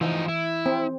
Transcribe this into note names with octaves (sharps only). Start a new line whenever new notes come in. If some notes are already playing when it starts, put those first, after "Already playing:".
E3 F3 D#4
E4
C4